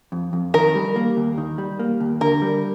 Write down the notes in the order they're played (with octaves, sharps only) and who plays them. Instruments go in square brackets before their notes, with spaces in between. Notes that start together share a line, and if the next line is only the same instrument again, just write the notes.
[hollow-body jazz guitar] F2
F2
[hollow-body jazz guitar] D#3 [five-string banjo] A#4
[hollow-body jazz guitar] G3
A#3
D#2
D#3
G3
A#3
D#2
[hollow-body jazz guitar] D3 [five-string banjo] A#4
[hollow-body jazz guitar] G3